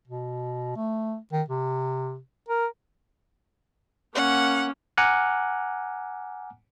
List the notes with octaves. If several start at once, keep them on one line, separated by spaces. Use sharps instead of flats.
B2
A3
D#3
C3
A#4
A#3 C#4 F#5
F#5 G#5 A#5 D6 F6 F#6